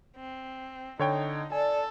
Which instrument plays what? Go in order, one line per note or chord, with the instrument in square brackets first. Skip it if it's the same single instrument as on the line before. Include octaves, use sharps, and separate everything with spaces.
[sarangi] C4
[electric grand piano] D3 C#5 G5 [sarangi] D#4
[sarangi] A4 [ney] D5 [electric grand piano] G#5